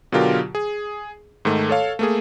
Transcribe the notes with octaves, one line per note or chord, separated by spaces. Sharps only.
B2 D3 F#3 F4 G4 A#4
G#4
G#2 D#3 A3
A4 C#5 F5
A3 A#3 G#4